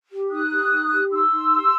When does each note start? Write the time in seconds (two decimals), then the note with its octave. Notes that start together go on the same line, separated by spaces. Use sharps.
0.10 G4
0.30 D#4 D#6 F#6
0.50 G4
0.70 D#4
0.91 G4
1.11 D#4 C6 E6
1.31 D#4
1.52 G4